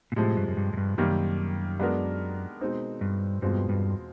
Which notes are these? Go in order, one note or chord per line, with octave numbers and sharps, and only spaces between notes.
A#2
A2 C3 F3 G#3
G2
F#2
G2
F#2
G2
F#2 C3 D#3 G3 A#3
G#3 B3 D4 F#4 A#4
B2 G#3 C4 D#4
G2
E2 G2 B2 G#3 C4 F4
G2